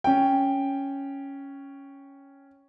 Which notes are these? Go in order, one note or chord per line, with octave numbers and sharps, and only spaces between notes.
C#4 G5